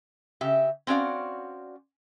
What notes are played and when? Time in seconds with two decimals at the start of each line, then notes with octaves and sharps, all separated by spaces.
0.41 C#3 G4 E5
0.87 C4 C#4 F#4 D5 F5